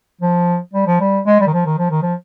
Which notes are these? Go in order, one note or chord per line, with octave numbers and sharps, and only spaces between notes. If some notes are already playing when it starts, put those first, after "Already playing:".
F3
G3
F3
G3
G#3
G3
D#3
F3
D#3
F3
D#3
F3